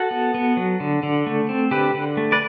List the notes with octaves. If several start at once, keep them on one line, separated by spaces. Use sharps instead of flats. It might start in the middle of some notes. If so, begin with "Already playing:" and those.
Already playing: F#4 A4
B3
B3
F#3
D3
D3
A3
C4
D3 G4 B4
D3
A3
B4 D5